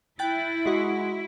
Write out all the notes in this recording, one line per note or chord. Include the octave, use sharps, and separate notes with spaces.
E4 G5 F#6 A6
G#3 F#4